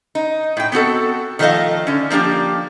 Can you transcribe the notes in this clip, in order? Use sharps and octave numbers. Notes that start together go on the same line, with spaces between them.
D#4
A2 G5
B3 C4 F#4 A4
D#3 F3 A3 D4 D#5 F5
D3 C#4
F3 A#3 D4 G4